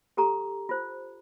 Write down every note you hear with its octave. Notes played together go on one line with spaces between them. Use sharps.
G4 A4 A#5 C#6
F4 C5